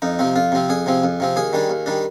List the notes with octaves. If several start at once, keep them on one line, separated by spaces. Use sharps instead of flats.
F2 D#4
C3 F3 C4
F2 F4
C3 F3 C4
F2 G#4
C3 F3 C4
F2
C3 F3 C4
D#2 G#4
D#3 G3 D4
D#2
D#3 G3 D4